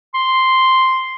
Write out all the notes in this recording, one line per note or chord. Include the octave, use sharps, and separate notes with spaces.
C6